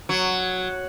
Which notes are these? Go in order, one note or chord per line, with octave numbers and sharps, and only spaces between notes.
F#3